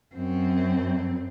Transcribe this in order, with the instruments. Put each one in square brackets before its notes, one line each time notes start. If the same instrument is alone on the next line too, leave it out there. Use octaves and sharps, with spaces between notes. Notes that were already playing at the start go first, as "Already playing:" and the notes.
[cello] F#2 C4